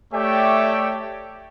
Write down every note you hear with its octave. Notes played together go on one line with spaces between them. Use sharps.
A3 G4 C#5 D5 E5 G5